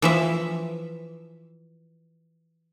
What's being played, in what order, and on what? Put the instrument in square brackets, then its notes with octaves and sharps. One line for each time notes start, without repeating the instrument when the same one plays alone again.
[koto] E3 F3 E5